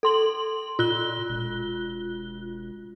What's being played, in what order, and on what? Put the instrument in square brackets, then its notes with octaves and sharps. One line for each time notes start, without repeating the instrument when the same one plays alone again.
[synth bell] A4 C6 F#7
[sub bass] A#2 [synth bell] F4 F#6 G7
[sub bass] E1